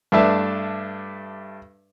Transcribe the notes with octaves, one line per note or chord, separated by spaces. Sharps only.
G2 A3 D4 E5 A5